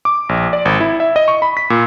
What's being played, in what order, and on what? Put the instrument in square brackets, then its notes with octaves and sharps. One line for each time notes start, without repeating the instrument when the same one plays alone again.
[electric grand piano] D6
A#1
D5
G#1
E4
E5
D#5
C#6
B5
B6
A#2